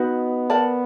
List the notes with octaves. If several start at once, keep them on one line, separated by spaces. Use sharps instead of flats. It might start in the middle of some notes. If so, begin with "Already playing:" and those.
Already playing: B3 D#4 F#4 B4 D#5
A#4 D5 F#5 A5